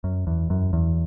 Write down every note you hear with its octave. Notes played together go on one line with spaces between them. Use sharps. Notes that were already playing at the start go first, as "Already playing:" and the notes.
F#2
E2
F#2
E2